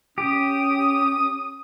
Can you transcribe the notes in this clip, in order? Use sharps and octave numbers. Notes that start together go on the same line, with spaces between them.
C#4 G4 D#6